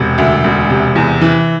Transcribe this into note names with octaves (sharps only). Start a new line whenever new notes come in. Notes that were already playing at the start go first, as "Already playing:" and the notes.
Already playing: E1 C3
D2 E5
E1
C3
E2
E3